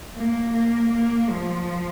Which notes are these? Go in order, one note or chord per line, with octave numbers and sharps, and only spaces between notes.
A#3
A#3
A#3
F3